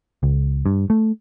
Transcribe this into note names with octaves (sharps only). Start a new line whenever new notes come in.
C#2
G2
A3